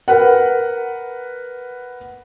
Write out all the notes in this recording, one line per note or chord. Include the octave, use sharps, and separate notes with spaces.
A#4 B4 F#5